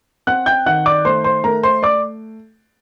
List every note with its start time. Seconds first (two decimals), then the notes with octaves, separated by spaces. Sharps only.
0.27 C4 F#5 F#6
0.46 G5 G6
0.66 D#3 F#5 F#6
0.86 D5 D6
1.05 A3 C5 C6
1.24 C5 C6
1.44 A3 A#4 A#5
1.63 C5 C6
1.83 D5 D6